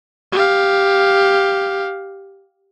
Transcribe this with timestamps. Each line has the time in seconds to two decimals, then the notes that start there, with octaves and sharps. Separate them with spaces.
0.32 G4 F5